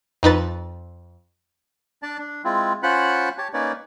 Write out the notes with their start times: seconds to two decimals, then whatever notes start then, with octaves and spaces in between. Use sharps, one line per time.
0.23 F2 D#4 B4 A6
2.03 D4 D5 A5
2.18 D4
2.44 G#3 C4 E4 F4
2.83 C#4 F4 C5 F#5 B5 F#6
3.38 G4 C#5 A5
3.53 A#3 C#4 D#4 B4 C#5 D5